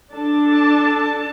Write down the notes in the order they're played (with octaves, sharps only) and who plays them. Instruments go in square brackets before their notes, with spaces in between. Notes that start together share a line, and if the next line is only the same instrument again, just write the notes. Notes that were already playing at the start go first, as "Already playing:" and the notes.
[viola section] D4 A4 A5